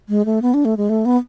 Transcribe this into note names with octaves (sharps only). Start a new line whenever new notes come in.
G#3
A3
B3
D4
A3
G#3
A3
B3